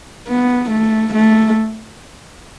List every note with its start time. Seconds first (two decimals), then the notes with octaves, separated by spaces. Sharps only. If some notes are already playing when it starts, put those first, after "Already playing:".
0.28 B3
0.71 A3
1.14 A3